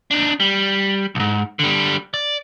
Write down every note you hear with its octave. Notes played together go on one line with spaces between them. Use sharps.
D4 D#4
G3
B1 G#2
D3 G3
D5